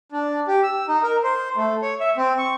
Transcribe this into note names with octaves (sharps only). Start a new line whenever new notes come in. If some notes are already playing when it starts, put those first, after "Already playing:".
D4
G4
E6
D#4
A#4
C5
A3
C#5
E5
C4
C#6